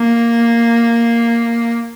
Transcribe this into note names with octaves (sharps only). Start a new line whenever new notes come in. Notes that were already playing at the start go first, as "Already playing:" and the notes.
Already playing: A#3